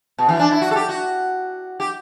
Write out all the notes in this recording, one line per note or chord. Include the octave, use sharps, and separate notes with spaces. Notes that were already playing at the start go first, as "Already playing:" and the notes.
B2
E3
D4
E4
F#4
A4
G4
F#4
G4